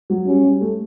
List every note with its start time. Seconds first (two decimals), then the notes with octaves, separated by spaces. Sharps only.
0.10 F#3
0.26 G3 C#4
0.44 G3
0.61 A3